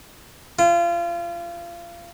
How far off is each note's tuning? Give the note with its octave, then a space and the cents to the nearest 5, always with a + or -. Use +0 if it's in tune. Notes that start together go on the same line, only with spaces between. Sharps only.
F4 -30